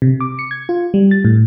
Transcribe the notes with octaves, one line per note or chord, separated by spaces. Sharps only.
C3
D6
C#7
G#6
F4
G3
A6
A2